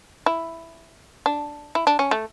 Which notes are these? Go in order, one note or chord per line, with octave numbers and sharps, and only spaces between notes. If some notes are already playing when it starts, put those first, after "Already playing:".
E4
D4
E4
D4
C#4
A3